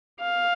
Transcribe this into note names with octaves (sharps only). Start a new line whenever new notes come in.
F5